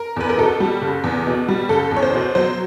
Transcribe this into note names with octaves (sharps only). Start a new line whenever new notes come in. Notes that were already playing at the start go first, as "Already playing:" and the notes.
Already playing: A#4
E2 B4
A#4
B2 A4
G3
F#1
E2
B2
G3
F#1 A4
E2
C#5
C5
B2
F#3 C5